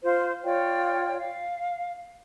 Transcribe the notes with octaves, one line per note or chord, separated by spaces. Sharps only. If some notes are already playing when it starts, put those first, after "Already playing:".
F4 C5
F4 C#5 D5 G5
F5